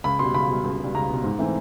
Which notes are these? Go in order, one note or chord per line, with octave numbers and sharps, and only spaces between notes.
C#2 B5
B2 G3 C6
C#2 B5
B2 G3
C#2
B2 G3
C#2 A#5
B2 G3
G#2
E3 A3 C4